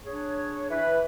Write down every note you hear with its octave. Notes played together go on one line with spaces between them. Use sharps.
D4 G#4 C#5
E3 B4